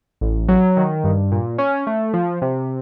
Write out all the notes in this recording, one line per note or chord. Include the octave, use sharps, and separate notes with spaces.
A1
F#3
D#3
G2
A#2
C#4
A3
F3
C3